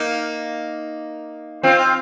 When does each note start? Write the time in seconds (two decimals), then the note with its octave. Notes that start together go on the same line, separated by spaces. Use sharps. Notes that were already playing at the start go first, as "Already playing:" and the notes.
Already playing: A#3 D#4
1.63 C4 F4